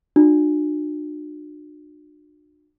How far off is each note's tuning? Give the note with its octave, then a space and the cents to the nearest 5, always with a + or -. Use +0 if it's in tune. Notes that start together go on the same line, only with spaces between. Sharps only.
D4 +40 F#4 -45